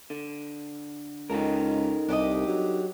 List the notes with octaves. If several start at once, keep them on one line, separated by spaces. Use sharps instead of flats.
D3
C#2 D#4 A4 A#4
C2 D4 G4 D#5
F#3